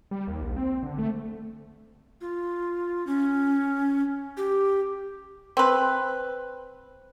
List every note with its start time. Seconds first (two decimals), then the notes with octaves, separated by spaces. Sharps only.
0.11 G3
0.27 D#2
0.42 A#1
0.56 C4
0.83 D3
0.98 A3
2.21 F4
3.07 C#4
4.37 G4
5.57 C4 B4